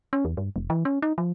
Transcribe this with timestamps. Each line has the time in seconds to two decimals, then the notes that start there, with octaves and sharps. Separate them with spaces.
0.13 C#4
0.25 E2
0.37 G2
0.56 F1
0.70 E3
0.85 C#4
1.02 D#4
1.18 F3